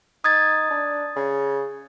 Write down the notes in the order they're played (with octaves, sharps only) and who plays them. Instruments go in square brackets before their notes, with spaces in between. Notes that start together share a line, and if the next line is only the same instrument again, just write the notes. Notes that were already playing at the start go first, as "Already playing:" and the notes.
[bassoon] D#4 [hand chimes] D#6 G#6 A6
[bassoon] D4
C#3